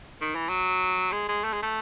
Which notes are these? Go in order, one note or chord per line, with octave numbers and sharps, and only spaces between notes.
D#3
E3
F#3
G#3
G#3
A3
G#3
A3